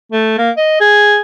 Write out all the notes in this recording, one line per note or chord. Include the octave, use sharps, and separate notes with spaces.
A3
A#3
D#5
G#4